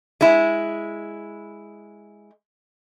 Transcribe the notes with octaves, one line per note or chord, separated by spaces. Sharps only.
G#3 E4